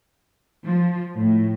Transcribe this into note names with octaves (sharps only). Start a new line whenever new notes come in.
F3
A2